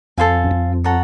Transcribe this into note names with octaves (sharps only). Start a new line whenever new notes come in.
F2 A4 C5 F5 G#5
F#2
F2
A4 C#5 F#5 A#5